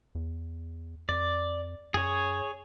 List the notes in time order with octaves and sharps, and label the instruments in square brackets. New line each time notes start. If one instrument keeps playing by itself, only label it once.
[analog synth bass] E2
[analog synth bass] F2 [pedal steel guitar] D5
[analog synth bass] F#2 [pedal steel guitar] G#4 C#5